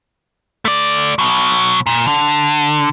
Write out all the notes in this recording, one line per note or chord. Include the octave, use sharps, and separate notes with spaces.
A3 D5
B2 F#3
A#2
D3